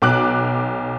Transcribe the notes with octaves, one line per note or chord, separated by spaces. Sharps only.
B1 D6 F#6